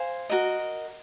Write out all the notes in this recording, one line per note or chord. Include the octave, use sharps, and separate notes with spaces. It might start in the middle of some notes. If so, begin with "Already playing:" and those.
Already playing: C5 F5 G#5
F#4 A#4 D#5